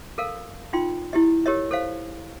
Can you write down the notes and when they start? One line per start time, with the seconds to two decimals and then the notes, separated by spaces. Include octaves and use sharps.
0.18 A4 A#4 F5
0.73 D#4 F4 G5 C6
1.13 E4 G4 D#5
1.46 G4 A#4 C#5 D#5
1.71 A4 C5 F5